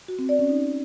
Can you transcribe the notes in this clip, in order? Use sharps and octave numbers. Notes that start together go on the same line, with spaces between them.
F#4
C4
D5
C#4
D#4